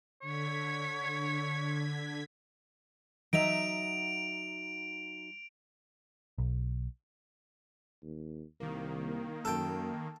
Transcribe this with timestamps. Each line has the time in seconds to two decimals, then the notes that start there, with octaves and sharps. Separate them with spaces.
0.22 D3 C#5 G#6 B6
3.33 F#3 D#4 E5 D7 F7
6.38 B1
8.03 D#2
8.60 C2 D#3 A#3
9.45 F#2 A4 G5